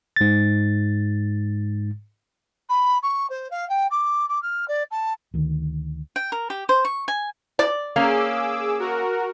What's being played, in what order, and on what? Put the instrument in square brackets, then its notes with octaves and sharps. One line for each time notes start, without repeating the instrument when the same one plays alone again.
[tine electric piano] G#2 A6
[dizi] B5
C#6
C5
F5
G5
D6
D6
F6
D5
A5
[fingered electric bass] D2 D#3
[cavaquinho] G5
A#4
G4
C5
C#6
G#5
[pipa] D5
[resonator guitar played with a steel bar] A#3 C#4 F5 [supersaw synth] G#4 D6 E6
[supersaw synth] F#4 A#4